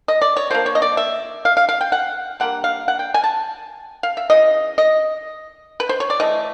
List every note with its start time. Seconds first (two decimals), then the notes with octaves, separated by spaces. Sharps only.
0.08 D#5
0.22 D5
0.37 C#5
0.50 D3 F3 A#3 C5
0.66 C#5
0.75 D#5
0.82 D5
0.97 E5
1.45 F5
1.57 F5
1.69 F5
1.81 G5
1.92 F#5
2.40 D3 G3 A#3 F#5
2.64 F5
2.88 F#5
2.99 G5
3.14 G#5
3.24 A5
4.03 F5
4.17 E5
4.30 C#3 E3 D#5
4.78 D#5
5.80 B4
5.89 C5
6.00 C#5
6.10 D5
6.20 E3 A3 D#5